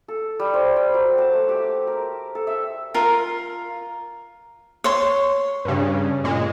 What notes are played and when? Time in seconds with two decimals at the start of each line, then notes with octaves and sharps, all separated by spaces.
0.08 A4
0.39 G3
0.54 C5
0.76 G5
0.94 F#3
1.18 A5
1.33 A3
1.49 G4
1.87 A#4
2.35 A4
2.47 E5
2.94 F4 A#4
4.84 C#5 C6
5.65 G2 C#3
6.24 A#2 G#3